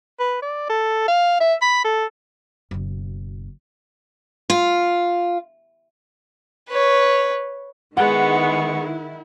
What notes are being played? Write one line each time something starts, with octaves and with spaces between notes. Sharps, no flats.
B4
D5
A4
F5
E5
B5
A4
F#1 B2
F4
B4 C#5
D#3 G#3 B3 E4 F#5 C#6